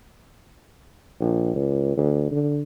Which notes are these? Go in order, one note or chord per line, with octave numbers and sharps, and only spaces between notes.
A#1
C#2
D2
D3